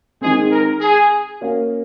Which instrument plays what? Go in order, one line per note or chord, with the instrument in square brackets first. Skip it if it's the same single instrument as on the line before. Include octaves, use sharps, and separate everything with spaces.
[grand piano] D#3 G#3 C4 [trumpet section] G#4
[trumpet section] A#4
G#4
[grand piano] A#3 C#4 F#4 C#5 F5